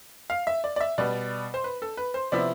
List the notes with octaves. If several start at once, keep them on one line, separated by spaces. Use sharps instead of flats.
F5
E5
D5
D5
E5
B2 G3 B3 D5
C5
B4
A4
B4
C5
C3 F3 B3 E4 D5